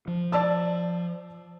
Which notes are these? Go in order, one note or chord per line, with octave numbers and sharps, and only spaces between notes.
F3
D5 A5 E6